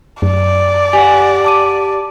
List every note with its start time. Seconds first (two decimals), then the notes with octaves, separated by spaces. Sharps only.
0.22 F#2 D5
0.93 G4 F#5 G#5
1.44 A5 D6 D#7